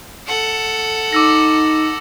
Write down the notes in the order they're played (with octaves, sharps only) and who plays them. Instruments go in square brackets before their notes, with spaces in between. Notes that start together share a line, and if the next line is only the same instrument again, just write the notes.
[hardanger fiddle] A4 F#5
[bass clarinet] D#4 [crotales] D6 E6 A#6